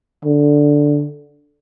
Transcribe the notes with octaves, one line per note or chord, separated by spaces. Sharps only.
D3